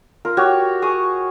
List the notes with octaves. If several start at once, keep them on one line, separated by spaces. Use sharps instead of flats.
F4 A#4
F#4 G4 C#5
G#4 C#6 D#6